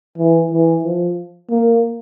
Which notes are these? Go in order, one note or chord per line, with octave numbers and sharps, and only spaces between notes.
E3
E3
F3
A#3